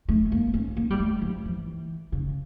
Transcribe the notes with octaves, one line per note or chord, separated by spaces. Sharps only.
A3
A#3
C#4
A#3
G3
A3
F3
E3
C#3